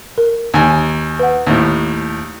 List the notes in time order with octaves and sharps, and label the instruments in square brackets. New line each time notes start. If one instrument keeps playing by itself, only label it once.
[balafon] A#4
[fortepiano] D#2 G#5
[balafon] B4 F#5
[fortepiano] D#2 A2